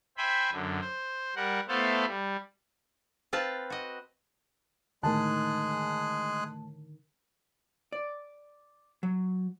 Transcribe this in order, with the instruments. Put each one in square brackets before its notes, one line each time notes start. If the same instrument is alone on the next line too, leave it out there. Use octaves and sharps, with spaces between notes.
[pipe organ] C5 E5 G5 G#5 B5
F#2 D3
C5
G3 A#4 F#5
A3 B3 E4 A4 C5 F5
G3
[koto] C4 F4 B4 A5
F#4 D#5
[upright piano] A2 A5 [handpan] D3 D#3 A#4 [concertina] G#3 G#4 F#6
[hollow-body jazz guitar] D5
F#3